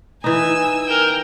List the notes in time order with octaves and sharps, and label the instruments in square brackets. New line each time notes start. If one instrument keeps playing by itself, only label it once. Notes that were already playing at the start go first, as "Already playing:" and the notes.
[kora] E3 D#4 [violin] G#5 E6
[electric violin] A#4 G5